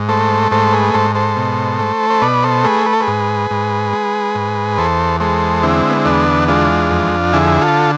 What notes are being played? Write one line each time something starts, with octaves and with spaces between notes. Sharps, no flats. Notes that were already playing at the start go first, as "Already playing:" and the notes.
Already playing: G#2
A3 A4 C5
G#2 A4 C5
G#4 B4
G#2 A4 C5
A4 C5
B2
A3
C5
B2 B4 D5
A4 C5
A3 G#4 B4
B4
A4
G#4 B4
G#2
G#2
G#3
G#2
E2 A4 C5
G#3 A4 C5
D3 C4 E4
B3
C4
E2 B3 D4
G#3 D4 F4
F2
D3 E4 G#4
F4 A4